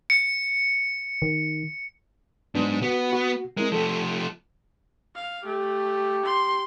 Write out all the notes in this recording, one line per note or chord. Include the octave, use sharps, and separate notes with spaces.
C#7
D#3
G#2 F#3 B3 D4
B3 F#4
F#4
G#3 C4 E4 A#4
F3 A3 A4
F5
A3 G4
C6